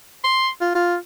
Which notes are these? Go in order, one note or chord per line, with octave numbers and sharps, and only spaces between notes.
C6
F4
F4